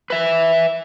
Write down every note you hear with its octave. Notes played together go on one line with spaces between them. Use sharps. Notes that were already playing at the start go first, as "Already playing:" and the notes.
B4 E5